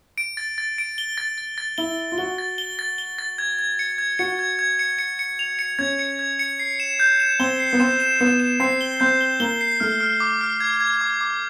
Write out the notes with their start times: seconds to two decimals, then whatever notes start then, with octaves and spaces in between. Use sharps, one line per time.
0.18 D7
0.37 A6
0.58 A6
0.78 D7
0.98 G7
1.18 A6
1.38 A6
1.58 A6
1.78 E4 G7
1.99 G7
2.12 F4
2.18 F#4 G7
2.38 A6
2.58 G7
2.79 A6
2.98 G7
3.19 A6
3.38 G#6
3.59 G#6
3.79 C#7
3.98 G#6
4.19 F#4 C#7
4.39 G#6
4.59 G#6
4.79 C#7
4.99 C#7
5.19 C#7
5.39 F7
5.59 C#7
5.79 C#4 G#6
5.99 C#7
6.19 G#6
6.39 C#7
6.60 C7
6.80 E7
7.00 G6
7.20 E7
7.40 C4 G7
7.60 C7
7.73 B3
7.80 C4 E7
8.00 E7
8.20 B3 E7
8.40 E7
8.60 C4 C7
8.81 G7
9.00 C4 G6
9.21 G7
9.40 A#3 G7
9.61 C7
9.80 A3 F6
10.00 F6
10.20 D6
10.41 F6
10.60 G#6
10.81 G#6
11.01 D6
11.21 D6